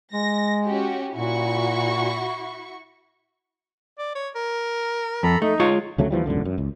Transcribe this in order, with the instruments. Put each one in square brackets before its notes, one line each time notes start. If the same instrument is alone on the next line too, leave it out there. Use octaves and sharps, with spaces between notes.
[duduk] G#3 [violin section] A#6
[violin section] C#4 F#4 G4
[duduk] A#2 [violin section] E4 F#4 C#6
[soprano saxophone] D5
C#5
A#4
[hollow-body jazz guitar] F2 [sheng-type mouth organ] A4 A#5 B5
[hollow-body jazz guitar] A3 [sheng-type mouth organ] D#4
[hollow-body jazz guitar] G#3 F4 C#5
[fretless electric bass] D2 C#3 F#3 A3
D#2 E3 F3 G3
E1 C#2 F#2 D3
F#2
C#2